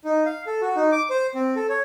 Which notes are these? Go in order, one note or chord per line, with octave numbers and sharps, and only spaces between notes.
D#4
F5
A4
F#4
D#4
D6
C5
C4
A4
C#5